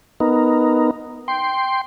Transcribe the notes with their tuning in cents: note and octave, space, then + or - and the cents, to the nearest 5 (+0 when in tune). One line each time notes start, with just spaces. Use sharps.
B3 +0 D#4 +0 A#4 +0
G5 +0 C6 +0